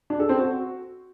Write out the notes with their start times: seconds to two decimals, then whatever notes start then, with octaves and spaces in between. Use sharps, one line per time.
0.10 D4
0.20 A4
0.29 C4
0.39 F#4